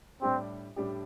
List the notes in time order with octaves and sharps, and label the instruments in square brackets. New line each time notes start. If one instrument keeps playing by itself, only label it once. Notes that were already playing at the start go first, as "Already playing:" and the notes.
[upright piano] A2 G3 D4 G4 [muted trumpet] C4
[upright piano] A2 G3 D4 G4